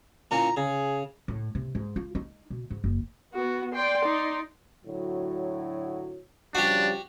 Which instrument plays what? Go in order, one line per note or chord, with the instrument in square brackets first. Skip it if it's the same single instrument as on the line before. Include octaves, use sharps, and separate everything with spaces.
[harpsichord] A#2 E3 C#4 [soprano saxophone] A#5
[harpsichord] C#3 [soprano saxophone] G#4
[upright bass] A2
C3
G#2
F4
D#4
B2
G#2
F#1
[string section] B3 [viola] F#4
[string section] D5 C6 [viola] G5
[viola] D#4
[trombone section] A2 D3 F#3
[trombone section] C#3 F3 G3 [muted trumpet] D4 [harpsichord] F#4 G4